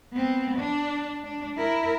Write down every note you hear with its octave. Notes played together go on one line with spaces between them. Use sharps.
B3 C4
D4
D4
E4 A#4